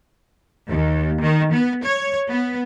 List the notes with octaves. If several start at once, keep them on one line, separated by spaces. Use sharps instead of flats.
D#2
D#3
B3
C#5
B3